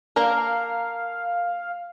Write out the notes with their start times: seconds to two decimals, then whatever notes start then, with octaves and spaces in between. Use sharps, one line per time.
0.16 A#3 D4 A#4 F5